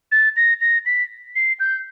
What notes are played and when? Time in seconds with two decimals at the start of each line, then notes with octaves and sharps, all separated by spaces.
0.12 A6
0.36 A#6
0.61 A#6
0.86 B6
1.36 C7
1.60 G6